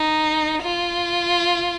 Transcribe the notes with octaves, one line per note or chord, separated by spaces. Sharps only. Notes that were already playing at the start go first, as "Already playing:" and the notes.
Already playing: D#4
F4